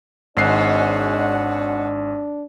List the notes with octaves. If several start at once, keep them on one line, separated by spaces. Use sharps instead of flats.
G#1 G#2 B2 C#4 D4 D5 F#5 C7